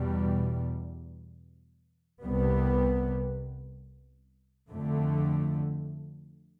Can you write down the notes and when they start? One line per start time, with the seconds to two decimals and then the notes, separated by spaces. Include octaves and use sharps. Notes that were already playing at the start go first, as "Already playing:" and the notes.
Already playing: E2 B2 G3
2.22 C2 C3 G3 B3
4.69 F2 D3 A3